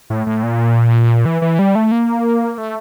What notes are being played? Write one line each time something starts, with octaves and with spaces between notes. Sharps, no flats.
A2
A2
A#2
E3
E3
G3
A3
A#3
A3